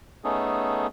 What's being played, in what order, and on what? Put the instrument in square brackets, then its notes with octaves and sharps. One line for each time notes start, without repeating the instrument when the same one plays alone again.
[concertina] A3 B3 C#4 D#4 G#4 A4